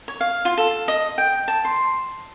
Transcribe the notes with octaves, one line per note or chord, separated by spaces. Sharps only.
C#5
F5
F4
A4
D#5
G5
A5
C6